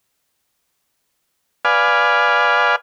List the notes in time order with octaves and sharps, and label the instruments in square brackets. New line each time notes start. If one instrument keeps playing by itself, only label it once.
[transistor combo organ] B4 D5 F5 G#5